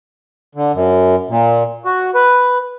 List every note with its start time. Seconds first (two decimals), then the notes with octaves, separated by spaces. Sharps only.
0.55 D3
0.74 F#2
1.29 A#2
1.85 F#4
2.15 B4